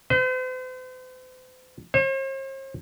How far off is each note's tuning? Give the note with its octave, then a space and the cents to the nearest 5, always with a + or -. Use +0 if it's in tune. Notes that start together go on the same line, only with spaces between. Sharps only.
C5 -45
C5 +45